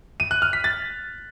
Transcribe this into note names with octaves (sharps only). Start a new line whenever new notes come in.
D#7
F#6
F6
B6
A6